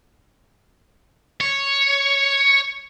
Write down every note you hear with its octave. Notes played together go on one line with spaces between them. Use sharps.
C#5